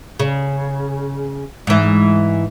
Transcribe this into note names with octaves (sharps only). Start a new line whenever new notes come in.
C#3
G#2 E3